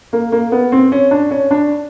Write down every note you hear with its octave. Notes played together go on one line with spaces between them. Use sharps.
A#3
A#3
B3
C4
C#4
D4
C#4
D4